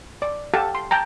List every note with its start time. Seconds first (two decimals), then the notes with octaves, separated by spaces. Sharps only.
0.22 D5
0.54 G4 A4 F5 F#5 A5
0.75 C6
0.91 G5 A5 A#5